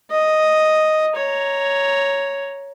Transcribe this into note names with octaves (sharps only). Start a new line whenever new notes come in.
D#5
C#5 A#5